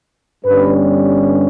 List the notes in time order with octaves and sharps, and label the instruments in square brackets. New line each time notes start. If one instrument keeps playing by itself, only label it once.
[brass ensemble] G1 G2 G3 C#4 B4